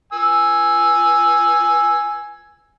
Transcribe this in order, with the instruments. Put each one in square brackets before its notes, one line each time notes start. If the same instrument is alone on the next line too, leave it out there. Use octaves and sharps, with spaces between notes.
[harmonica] G#5 E6